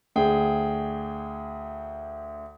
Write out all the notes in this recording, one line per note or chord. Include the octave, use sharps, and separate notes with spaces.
D2 G#4 G5